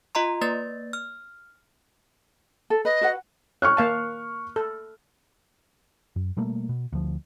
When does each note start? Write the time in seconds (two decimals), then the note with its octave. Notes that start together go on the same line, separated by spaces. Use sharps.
0.15 F4 D#5 A#5 C6
0.41 A#3 B4 D5 A6
0.93 F6
2.70 A4
2.85 B4 D#5
3.01 F#4 B4 F#5
3.62 C#5 C#6 F6 F#6
3.77 A#3 F5 A5
4.56 A4
6.16 F#2
6.37 B2 G3 A3 A#3
6.69 B2
6.93 D2 F3